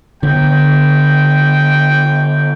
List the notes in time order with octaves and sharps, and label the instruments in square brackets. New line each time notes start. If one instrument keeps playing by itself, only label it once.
[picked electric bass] D3 B3 [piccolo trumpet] G5